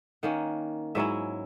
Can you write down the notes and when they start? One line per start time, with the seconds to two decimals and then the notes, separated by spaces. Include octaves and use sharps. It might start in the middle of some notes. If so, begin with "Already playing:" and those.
0.23 D#3 A#3 C#4 F#5
0.95 G#2 F#3 C#4 E4 E5